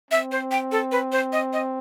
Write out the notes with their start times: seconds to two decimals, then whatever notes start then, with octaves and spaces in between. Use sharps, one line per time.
0.11 C4 E5
0.32 C5
0.51 G5
0.72 A4
0.92 B4
1.12 C5
1.33 D#5
1.53 D#5